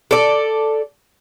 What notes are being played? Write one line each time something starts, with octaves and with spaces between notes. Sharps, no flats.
A4 D5